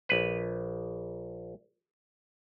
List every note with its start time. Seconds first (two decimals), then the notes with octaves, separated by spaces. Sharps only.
0.09 A#1 B4